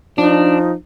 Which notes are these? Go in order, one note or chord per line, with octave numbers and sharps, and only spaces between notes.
F3 D4 D#4